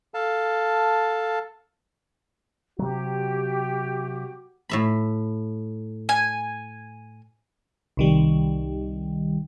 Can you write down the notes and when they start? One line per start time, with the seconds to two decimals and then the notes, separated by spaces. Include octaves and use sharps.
0.14 A4 F5 A5
2.79 C3 F#3 F#4 G4
4.69 A2 E5 B5
6.09 G#5
7.97 C2 D#3 G3